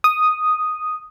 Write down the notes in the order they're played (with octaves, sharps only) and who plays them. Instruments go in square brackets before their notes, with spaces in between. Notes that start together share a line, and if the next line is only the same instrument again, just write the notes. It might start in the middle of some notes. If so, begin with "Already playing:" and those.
[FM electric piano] D#6